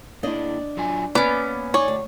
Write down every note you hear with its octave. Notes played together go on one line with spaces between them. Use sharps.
A#3 D4 E4 D5 D#5
F#3 F4 G#5
A#3 B3 C#4 D5
D#4 C#5 D5 G#5
D2